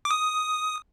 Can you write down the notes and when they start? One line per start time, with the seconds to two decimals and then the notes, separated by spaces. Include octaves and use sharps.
0.05 D6
0.11 D#6